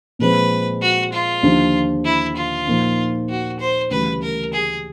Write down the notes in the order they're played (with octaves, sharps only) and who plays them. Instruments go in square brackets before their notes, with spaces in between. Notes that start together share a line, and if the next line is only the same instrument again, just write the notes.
[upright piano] A#2 F3 G#3 C4 [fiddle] B4
[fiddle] F#4
F4
[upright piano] D#2 D3 F3
[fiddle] E4
F4
[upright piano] A#2 F3 A#3 D#4
[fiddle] F#4
C5
[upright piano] D2 C#3 E3 G3 [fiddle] B4
[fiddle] A#4
G#4